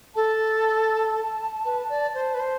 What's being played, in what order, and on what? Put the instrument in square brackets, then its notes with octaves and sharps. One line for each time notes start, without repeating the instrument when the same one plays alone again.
[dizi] A4 [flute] A5
[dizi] B4
D5
C5
B4
C5